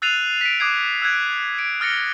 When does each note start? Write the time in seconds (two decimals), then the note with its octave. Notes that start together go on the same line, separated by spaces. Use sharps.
0.02 E6 F#6 A6 C7 D#7 F7
0.41 B6 D7
0.60 D6 D#6 F#6 G#6 C7
1.02 E6 F#6 G#6 D7
1.59 D7
1.80 D#6 F6 A6 A#6 C#7